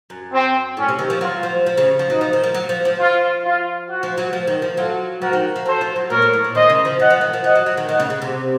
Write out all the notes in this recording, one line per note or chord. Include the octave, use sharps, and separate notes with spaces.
F#2
C4
A2 C#4
C3
D#3
F3
F#3 F4
F3
F3
C#3
F3
F#3 D#4
F3
D#3
F3
F#3
F3
F3
F4
F4
F#4
F3
F#3
F3
D#3
F3
F#3 F4 A4
F3 F#4 A#4
D#3
F3
F#3 A4 C5
F3
F#3
A#2 A#4 C#5
A2
A2
A#2
D#3 C5 D#5
C#3
F3
F3 D#5 F#5
F3
D#3
F3
F3 D#5 F#5
F#3
F#3
D#3
D#3 D#5 F#5
C#3
C#3
C3